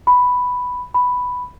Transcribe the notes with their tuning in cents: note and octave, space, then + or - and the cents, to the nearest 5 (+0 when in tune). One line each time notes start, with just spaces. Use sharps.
B5 +5
B5 +5